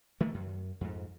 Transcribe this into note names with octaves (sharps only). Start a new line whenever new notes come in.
D#3 A3 A#3
F#2
F2 G#2